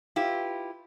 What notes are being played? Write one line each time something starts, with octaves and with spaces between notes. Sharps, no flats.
E4 F4 G4 B4